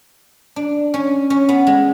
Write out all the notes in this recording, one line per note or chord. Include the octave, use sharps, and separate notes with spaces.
D4
C#4
C#4
B3
G#3